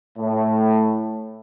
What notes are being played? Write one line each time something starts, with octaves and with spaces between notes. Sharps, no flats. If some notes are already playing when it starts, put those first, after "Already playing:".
A2